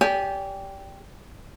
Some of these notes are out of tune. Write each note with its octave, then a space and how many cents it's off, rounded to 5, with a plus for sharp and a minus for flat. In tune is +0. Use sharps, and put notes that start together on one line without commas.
G4 +0 D5 -30 G#5 +0